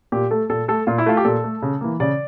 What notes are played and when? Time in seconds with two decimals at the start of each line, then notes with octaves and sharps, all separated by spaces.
0.12 A#2 G4
0.31 A3 A4
0.50 A#2 A4
0.68 A3 A4
0.87 A#2 F4
0.98 E4
1.06 A3 F4
1.17 G4
1.25 A#2 A4
1.44 A3
1.62 C#3
1.81 E3 A#3
2.00 C#3 D5